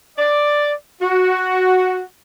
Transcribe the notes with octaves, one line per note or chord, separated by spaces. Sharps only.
D5
F#4